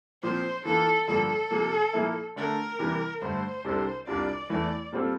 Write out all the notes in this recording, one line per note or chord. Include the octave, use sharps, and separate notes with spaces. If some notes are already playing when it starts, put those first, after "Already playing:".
A#2 F3 C4 C5
E3 A#3 F4 A4
G2 D3 F3 A#3 A4
C3 F3 A#3
A#2 F3 A#3 E4
D3 A3 D4 A#4
C3 E3 G3 A#3
G2 D3 A3 C5
C2 C3 G3 D4 A4
C2 C3 G3 D4 F4 D5
E2 E3 A3 D5
A#2 G3 C4 F4 A4